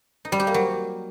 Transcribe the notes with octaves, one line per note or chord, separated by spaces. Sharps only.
D#4
G3
G4
A#3
F#3